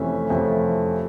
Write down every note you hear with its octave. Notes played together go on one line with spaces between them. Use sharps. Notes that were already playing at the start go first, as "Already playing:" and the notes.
Already playing: F2 C3 E3 A3 C#4 E5
F2 C3 E3 A3 C#4